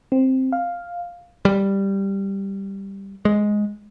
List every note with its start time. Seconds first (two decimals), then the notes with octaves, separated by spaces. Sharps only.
0.12 C4
0.52 F5
1.45 G3
3.25 G#3